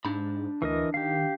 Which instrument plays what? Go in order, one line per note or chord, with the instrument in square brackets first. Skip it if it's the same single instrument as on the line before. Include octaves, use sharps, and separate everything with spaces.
[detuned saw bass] G#2 [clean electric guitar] D4 B5
[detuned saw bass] D2 [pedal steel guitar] E3 A#4 D#5
[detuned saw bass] D#3 [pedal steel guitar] G4 F5